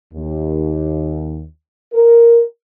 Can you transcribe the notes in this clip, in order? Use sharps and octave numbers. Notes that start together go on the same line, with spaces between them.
D#2
A#4